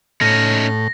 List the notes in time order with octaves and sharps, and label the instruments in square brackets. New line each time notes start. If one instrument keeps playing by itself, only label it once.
[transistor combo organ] A2 [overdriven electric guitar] C#4 D#4 [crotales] A#6